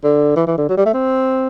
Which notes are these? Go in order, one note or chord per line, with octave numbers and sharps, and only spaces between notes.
D3
E3
E3
D3
F#3
G3
A3
C4